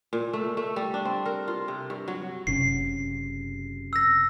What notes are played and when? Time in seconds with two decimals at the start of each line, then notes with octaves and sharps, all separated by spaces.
0.13 A#2
0.33 A3
0.57 A3
0.76 G3
0.94 D4
1.05 C4
1.25 A#4
1.48 F4
1.68 C3
1.90 G2
2.08 F#3
2.47 F#1 C3 C#4 C7
3.93 E6 A#6